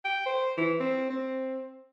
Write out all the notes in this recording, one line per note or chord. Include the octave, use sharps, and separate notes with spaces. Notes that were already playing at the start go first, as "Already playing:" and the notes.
G5
C5
E3
C4
C4